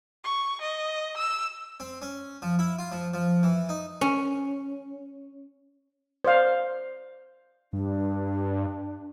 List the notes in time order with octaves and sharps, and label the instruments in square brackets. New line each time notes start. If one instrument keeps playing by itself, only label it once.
[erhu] C#6
D#5
E6
[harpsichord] C4
C#4
F3
E4
F4
F3
F3
E3
D#4
[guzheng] C#4
[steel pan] C5 D5 F5
[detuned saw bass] G2 [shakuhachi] D4